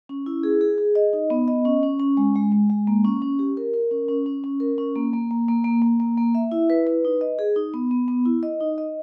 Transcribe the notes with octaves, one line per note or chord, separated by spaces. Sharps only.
C#4
E4
G#4
G#4
G#4
D#5
D#4
B3
D#5
C#4
C#4
C#4
G#3
G#3
G#3
G#3
A#3
C#4
C#4
G4
A#4
A#4
C#4
C#4
C#4
C#4
A#4
C#4
A#3
A#3
A#3
A#3
A#3
A#3
A#3
A#3
E5
E4
B4
B4
D#4
D#5
G#4
D#4
B3
B3
B3
E4
D#5
D#4
D#5